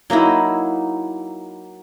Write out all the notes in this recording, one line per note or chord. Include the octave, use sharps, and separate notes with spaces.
F#3 A#3 D#4 E4